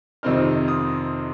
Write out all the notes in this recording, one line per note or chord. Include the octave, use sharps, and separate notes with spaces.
F2 C3 D#3 C4 D#4 F6
D#6